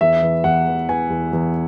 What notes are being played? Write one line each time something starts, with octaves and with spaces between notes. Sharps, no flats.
E2 E5
E3
E2 F#5
E3
E3 G#5
E2
E2